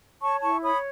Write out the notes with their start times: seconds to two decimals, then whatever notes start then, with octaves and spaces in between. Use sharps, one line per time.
0.21 C#5 A5 C#6
0.42 E4 A5 C#6
0.63 C#5 B5 D#6